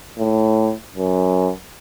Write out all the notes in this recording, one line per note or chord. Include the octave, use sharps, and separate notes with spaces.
A2
F#2